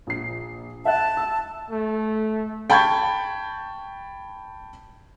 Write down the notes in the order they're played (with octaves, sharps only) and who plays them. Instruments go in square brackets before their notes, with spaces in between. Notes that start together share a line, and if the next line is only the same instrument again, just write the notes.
[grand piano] A#1 C7
[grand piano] E5 F#5 F#6 [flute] A5
[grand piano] E6
[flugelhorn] A3
[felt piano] G5 A5 B5 C#6 G6 G#6